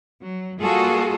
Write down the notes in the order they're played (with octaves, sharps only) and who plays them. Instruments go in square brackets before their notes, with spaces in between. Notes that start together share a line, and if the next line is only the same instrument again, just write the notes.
[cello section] F#3
G3 A#3 F4 F#4 G#4 A4